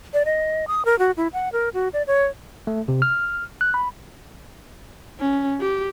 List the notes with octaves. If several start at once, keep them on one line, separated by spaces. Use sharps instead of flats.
D5
D#5
D#6
A#4
F#4
E4
F#5
A#4
F#4
D5
C#5
A3
C3
F6
F#6
B5
C#4
G4